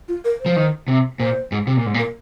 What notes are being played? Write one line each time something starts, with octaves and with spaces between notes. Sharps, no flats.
F4
A#4
C5
F3
D#3
C3
A#2 C5
G#2
C3
A#2
G#2
A#2
A#4